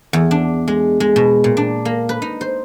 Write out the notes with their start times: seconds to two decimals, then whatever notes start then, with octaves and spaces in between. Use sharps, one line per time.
0.13 E2
0.31 D4
0.68 G#3
1.00 G#3
1.16 B2
1.44 A#2
1.57 D4
1.85 A#3
2.09 B4
2.22 D#4
2.41 C5